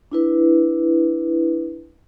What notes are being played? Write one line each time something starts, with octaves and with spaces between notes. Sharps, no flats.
D4 E4 B4